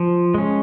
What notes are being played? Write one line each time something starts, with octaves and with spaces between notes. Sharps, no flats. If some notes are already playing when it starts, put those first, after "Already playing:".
Already playing: F3
G#3 C#4